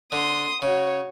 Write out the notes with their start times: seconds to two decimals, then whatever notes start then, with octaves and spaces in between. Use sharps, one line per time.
0.12 D3 C6 D#6
0.62 C#3 F#4 C#5